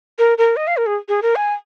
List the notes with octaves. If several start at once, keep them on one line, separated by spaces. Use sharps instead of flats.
A#4
A#4
D#5
F5
A#4
G#4
G#4
A#4
G#5